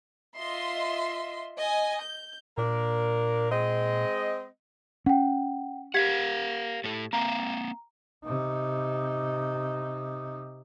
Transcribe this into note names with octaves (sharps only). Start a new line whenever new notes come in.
F4 D#5 E5 C6
D#5 G#5
G6
A#2 A#3 D4 A#4
G#3 C4 D#5
C#4 F#5 G5
G4 A#4 F5 F#5 G#6 B6
A2 A4
A#3 C4 F5 A#5
C3 D#4